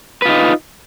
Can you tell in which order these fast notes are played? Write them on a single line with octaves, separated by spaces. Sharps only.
B4 F4 D#4